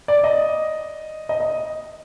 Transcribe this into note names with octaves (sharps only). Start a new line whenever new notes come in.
D5
D#5
D#5
D#5